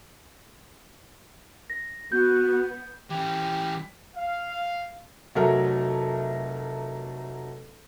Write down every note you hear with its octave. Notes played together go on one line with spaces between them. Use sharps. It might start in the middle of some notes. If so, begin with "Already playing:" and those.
A#6
B3 F#4 G6
E3 C#4 G4
F5
F1 F#3 A3 A#4